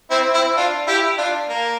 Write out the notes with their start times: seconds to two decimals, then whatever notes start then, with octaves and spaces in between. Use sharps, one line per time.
0.11 C4 E4
0.34 C4 E4
0.57 D4 F4
0.87 E4 G4
1.18 D4 F4
1.49 A#3